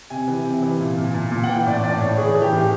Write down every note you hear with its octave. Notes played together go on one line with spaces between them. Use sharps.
C3 G#5
E3
C3
E3
A#2
A#2
A#2
A#2
F#5
E3 G5
A2 D5
A2 D5
A2 C#5
E3 G#4
E3
G4
A2